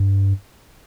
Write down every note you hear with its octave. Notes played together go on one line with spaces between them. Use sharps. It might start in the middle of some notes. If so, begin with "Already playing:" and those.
Already playing: G2